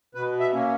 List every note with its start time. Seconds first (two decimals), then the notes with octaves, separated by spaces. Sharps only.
0.15 B2 B4
0.40 E5
0.53 A#3 C#4